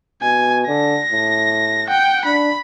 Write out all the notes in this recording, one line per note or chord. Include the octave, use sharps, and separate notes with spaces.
B2 G#5
D3 A#6
A2
F#5 G5
D4 B5